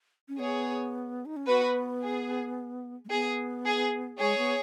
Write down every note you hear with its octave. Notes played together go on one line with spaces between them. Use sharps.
C#4
B3 G#4 C#5
D#4
C#4
B3 F#4 B4
G#4
G#3
B3 G#4
G#4
G#3 G#4 C#5
B3